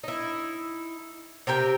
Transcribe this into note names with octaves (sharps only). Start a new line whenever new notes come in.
D#4 E4
C3 G4 A#4 G5